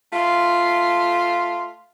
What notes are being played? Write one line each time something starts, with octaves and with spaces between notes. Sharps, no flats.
A3 F4